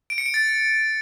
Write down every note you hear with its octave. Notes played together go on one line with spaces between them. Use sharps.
D7
C#7
D7
A6